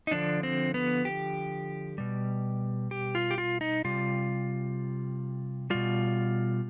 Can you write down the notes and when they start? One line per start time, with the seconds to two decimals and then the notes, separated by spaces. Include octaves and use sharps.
0.07 D#4
0.11 D3 F3 D4
0.43 C4
0.74 B3
1.05 G4
1.98 B2 G3
2.91 G4
3.15 F4
3.31 G4
3.38 F4
3.61 D#4
3.84 C3 G3 F4
5.70 B2 G3 F4